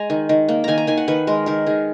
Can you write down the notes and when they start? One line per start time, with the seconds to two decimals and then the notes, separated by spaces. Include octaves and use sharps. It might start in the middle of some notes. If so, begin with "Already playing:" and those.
Already playing: G#3 G#5 A#5
0.10 D#3
0.29 D#3
0.48 A#3
0.64 D#3 G#5 A#5
0.78 A#5
0.87 D#3 G#5
0.97 F#5
1.08 D#3 B4
1.27 G#3 A#4
1.46 D#3 A#4
1.66 D#3 G#4